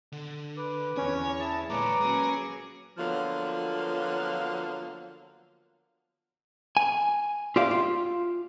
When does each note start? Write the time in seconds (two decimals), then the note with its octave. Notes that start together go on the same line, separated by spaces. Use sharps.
0.12 D3
0.57 B4 D6
0.97 E2 C#4 C#5
1.40 E4 G#4 A5
1.70 A#2 D3 G#3 A#3 B4 C#5 A#5 D6
2.01 F#3 A#3 C#4 G#4
2.98 D3 F3 F#3 A#3 B3 F4
6.77 G#5
7.56 F4 G4 D5 E5 F5
7.71 F4